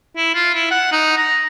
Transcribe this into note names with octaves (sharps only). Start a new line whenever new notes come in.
E4
F4
E4
F#5
D#4
A#5